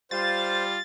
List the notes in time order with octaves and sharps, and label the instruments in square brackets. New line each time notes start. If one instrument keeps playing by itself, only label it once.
[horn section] G3 F4 [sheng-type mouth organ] C5 [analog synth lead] A6